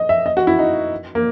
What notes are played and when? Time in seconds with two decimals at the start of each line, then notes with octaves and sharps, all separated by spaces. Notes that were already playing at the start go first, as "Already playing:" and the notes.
Already playing: D#5
0.09 E5
0.26 D#5
0.37 F#4
0.47 E4
0.59 D#4
1.15 A#3